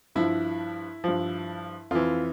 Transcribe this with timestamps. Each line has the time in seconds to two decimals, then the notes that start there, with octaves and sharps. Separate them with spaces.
0.15 G2 F3 E4
1.04 G2 F3
1.91 F2 E3 F4